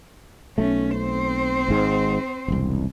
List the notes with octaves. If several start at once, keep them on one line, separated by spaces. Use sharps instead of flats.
B1 A3 C#4
C4 C5
G#1 G#2
E1 C2